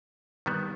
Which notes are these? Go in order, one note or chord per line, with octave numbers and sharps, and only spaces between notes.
D#3 G3 B3